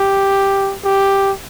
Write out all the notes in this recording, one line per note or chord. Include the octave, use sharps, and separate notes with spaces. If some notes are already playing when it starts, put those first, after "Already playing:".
Already playing: G4
G4